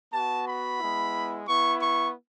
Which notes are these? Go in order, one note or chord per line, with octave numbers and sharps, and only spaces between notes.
B3 F#4 A5
B5
G#3 B3 E4
B3 E4 C#6
C#6